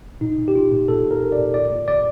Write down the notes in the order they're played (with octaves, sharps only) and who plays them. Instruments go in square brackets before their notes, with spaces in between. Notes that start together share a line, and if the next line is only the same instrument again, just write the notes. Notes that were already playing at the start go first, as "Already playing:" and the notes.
[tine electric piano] A#2 D#4
A#2
G4
A#2 F4
A#2
A#2 A4
A#2
A#4
A#2
D5
A#2
A#2 D5
A#2
A#2 D5